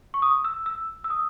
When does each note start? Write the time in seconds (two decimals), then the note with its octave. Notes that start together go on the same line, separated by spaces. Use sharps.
0.14 C#6
0.22 D#6
0.44 E6
0.66 E6
1.04 E6
1.10 D#6